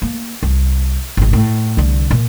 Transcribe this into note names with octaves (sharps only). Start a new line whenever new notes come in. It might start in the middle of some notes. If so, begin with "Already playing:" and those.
A#3
C2
G#1 G#2
A2
C2 D3
A#2